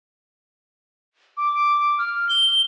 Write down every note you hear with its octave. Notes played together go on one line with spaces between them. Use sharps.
D6
F6
G7